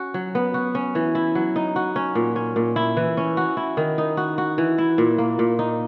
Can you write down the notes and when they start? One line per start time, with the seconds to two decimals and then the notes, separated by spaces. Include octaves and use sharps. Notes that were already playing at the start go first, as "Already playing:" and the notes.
Already playing: C#4 F#4
0.14 F#3
0.35 B3
0.54 F#4
0.75 C#4
0.95 E3
1.15 E4
1.35 F#3
1.56 D#4
1.76 F#4
1.96 C#4
2.15 A#2
2.36 C#4
2.56 A#2
2.76 E4
2.97 E3
3.17 C#4
3.37 F#4
3.57 E4
3.77 D#3
3.98 D#4
4.17 F#4
4.38 F#4
4.58 E3
4.78 E4
4.98 A#2
5.18 A#3
5.39 A#2
5.59 D#4